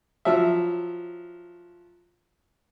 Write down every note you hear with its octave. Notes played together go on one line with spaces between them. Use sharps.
F3 F#3 E5